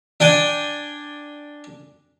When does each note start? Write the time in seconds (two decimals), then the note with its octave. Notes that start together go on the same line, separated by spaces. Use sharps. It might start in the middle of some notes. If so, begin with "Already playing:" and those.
0.20 D4 G5 G#5